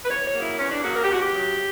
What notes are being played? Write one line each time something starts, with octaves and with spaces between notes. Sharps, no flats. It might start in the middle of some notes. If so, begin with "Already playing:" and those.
B4
E2 C#5
C#5
C#3 F#3 A#3
E4
E2 C#4
D4
C#3 F#3 A#3 F#4
A#4
G4
E2 F#4
G4
C#3 F#3